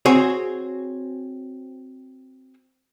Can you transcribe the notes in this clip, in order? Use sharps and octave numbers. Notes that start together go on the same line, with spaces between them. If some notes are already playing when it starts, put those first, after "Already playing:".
C4 F#4 G#4 C#5